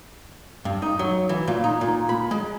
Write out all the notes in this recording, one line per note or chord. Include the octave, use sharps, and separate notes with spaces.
G2
D#4
F#3
E3
A#2
D#4
A#2
B5
G#3